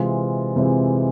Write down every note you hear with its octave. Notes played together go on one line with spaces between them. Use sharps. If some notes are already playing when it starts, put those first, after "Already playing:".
Already playing: C3 E3 G#3 C4 F4
C3 E3 G#3 C4 F4